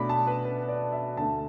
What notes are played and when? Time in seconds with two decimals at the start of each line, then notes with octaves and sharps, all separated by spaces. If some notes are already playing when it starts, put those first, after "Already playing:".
Already playing: B2 A3 D4 B5 D6
0.09 A5
0.27 B4
0.45 B4
0.69 D5
0.92 E5
1.17 D2 D3 A3 A5